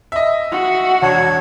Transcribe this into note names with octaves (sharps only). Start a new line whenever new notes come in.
D#5 E5
F#4 F#5
E1 D4 C#5